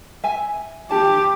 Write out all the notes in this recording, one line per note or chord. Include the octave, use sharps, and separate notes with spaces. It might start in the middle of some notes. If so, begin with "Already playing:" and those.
E5 G#5
G4 A5